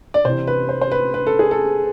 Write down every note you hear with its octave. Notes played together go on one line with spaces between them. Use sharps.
D5
C3 E3 C5
B4
C5
C5
B4
B4
A4
G#4
A4